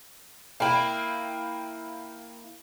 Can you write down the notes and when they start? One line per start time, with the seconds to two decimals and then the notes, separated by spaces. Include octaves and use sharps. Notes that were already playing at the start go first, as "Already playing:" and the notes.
0.60 A#3 E4 F5 G5